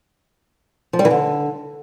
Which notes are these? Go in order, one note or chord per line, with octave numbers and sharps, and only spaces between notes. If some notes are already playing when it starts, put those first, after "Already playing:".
F3
G3
E3
D3